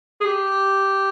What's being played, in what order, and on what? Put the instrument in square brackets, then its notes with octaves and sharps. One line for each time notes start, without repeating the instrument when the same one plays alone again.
[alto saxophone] G#4
G4